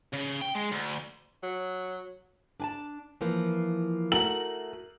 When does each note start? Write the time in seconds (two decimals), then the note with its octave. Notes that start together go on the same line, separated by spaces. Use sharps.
0.13 C#3
0.42 G5
0.56 G#3
0.72 D2
1.43 F#3
2.60 D4 G#5 A5
3.21 E3 F3 A#3
4.12 A3 F#4 A#4 F#7